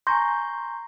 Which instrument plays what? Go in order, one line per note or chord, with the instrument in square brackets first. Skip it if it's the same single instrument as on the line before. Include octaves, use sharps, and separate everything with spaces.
[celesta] G#5 A#5 C#6 [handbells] C6 G6 A#6